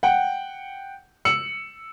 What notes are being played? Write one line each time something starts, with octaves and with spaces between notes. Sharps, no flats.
F#5 G5
E6 C#7 F#7